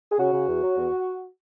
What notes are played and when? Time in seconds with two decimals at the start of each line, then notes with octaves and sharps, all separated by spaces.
0.12 G#4
0.19 C#3 F#4
0.33 C#3
0.48 E2
0.64 F#3
0.78 E2